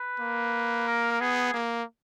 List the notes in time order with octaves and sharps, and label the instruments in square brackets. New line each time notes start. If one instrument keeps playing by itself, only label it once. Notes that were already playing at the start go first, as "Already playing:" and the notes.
Already playing: [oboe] B4
[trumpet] A#3
[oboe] A#4
A#4
[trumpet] B3 [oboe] G#4
[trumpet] A#3